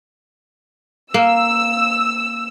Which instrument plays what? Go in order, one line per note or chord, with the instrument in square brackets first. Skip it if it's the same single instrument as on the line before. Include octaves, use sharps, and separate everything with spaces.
[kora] A#3 [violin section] E6